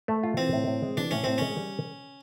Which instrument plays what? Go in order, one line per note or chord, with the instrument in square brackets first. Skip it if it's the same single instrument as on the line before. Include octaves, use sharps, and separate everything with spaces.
[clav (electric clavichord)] A3
F4
[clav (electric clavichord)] E3 [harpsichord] C4
[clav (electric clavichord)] A2
A2
G#3
[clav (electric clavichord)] E3 [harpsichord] D4
[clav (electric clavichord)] A2 [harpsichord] C#4
[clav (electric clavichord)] A2 [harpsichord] C4
[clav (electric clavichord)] G#3 [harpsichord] C#4
[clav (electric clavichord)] G3